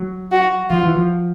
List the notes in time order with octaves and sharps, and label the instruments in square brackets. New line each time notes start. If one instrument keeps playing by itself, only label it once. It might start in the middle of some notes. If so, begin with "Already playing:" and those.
Already playing: [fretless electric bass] F#3
[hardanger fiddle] F#4
[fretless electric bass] F3 [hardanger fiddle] F4
[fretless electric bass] E3
F3